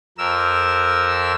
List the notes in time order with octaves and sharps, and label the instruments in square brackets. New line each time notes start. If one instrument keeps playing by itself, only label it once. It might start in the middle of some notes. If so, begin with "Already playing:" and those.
[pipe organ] F2 A#4 E6